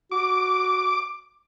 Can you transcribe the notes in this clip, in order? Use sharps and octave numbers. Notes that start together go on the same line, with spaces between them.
F#4 D6